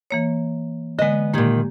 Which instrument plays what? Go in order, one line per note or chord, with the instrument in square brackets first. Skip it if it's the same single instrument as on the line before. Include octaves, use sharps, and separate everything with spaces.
[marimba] E3 A#3 C#5
[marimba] D3 G#3 [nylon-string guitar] B3 D#5
[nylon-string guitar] A#2 D#3 [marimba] A#3 G4 G#6